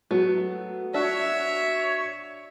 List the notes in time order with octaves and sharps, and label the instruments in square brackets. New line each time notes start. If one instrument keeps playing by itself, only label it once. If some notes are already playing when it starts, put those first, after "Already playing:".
[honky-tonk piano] F#3 [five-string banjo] A3 B3
[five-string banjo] D4 F#4 [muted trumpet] C#5 [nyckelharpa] E5